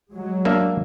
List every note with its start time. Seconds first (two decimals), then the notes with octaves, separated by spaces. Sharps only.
0.11 F#3 G#3
0.45 A#3 D4 E5